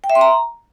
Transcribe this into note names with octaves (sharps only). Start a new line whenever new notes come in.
G5
E5
C6
A#5